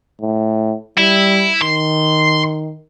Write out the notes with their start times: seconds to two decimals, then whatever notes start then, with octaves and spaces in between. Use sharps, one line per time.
0.21 A2
0.98 G3 E4
1.62 D#3 C6